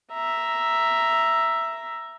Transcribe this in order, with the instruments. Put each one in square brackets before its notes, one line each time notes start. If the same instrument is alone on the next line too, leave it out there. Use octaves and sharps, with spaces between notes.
[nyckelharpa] E5 A#5